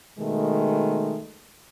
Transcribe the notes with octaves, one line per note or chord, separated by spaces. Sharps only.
B2 D#3 G#3 A3